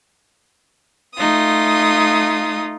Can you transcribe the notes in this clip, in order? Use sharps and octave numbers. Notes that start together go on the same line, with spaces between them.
A3 D#4 F4 D#6